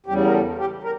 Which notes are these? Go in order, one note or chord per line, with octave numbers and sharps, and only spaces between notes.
E2 C#3 G3 G4
A#4
A4
G4
A#4